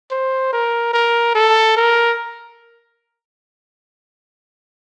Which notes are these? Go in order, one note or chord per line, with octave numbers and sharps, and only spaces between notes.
C5
A#4
A#4
A4
A#4